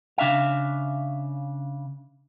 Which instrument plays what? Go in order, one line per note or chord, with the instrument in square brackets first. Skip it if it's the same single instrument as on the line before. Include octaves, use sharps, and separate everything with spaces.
[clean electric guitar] C#3 D4 E5 F5